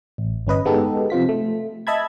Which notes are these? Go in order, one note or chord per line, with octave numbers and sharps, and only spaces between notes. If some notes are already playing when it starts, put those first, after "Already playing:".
A1
G1 C#4 B4 D#5
G#3 B3 D#4 G4 A4
C3 F3 F4 B6
A3
D#5 E5 A5 B5 G#6